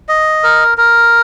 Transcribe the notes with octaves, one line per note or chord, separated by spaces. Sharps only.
D#5
A#4
A#4